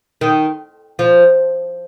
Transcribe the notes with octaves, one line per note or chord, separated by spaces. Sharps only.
D#3
F3